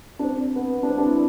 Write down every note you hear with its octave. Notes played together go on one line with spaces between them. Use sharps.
D4
C4
B3
D4
C4
D4
E4